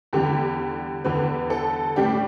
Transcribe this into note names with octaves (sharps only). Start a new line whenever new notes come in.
E2 D3 G3 G4
E2 D3 G3 B4
A4
A2 G3 D4 G4